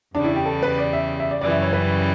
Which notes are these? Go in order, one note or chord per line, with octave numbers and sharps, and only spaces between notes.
E2 C#3 G3 D4
E4
G4
A4
B4
D5
E5
E5
D5
F#2 C#3 E3 G3 D5
E5
C#5
B4